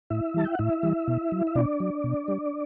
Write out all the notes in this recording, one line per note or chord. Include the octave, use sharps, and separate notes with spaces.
A2 E4 E5
E3 G3 A5
G5
F#5
A2 E4 E5
E3 G3
B2
F#3
E5
B2 D4 D5
F#3
B2
G3